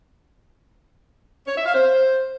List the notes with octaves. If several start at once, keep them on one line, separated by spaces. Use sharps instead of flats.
C#5
E5
F5
C5